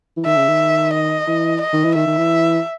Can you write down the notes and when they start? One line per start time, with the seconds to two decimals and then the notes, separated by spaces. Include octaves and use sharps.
0.17 E3
0.25 D#3 E5
0.37 C#3
0.49 D#3
0.93 D#5
1.27 E3
1.62 D#5
1.73 D#3
1.84 E3
1.95 D#3 E5
2.07 D#3
2.18 E3